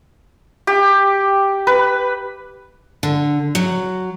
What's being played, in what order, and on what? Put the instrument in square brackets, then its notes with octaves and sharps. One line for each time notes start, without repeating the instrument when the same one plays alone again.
[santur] G4
B4
[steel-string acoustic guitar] D3
F#3